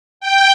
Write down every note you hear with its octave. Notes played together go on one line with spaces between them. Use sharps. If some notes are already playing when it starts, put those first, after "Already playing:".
G5